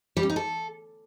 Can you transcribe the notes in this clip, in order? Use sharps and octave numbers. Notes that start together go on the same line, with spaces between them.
G3
C#4
D#4
A4